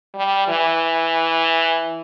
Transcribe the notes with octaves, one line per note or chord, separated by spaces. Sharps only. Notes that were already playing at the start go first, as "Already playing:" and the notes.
G3
E3